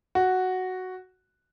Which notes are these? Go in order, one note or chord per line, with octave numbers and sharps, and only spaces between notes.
F#4